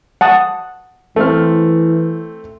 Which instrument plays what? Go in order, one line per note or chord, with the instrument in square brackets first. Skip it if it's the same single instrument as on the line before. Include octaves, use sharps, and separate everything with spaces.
[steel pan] F#5 A5 D#6
[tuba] E3 [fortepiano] A3 C4 F6